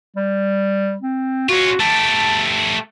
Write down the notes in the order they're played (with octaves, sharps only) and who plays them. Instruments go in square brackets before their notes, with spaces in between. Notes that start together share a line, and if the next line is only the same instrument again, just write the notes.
[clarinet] G3
C4
[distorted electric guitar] C#4 F4 [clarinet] F#4
[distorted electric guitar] A3 G4 [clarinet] A5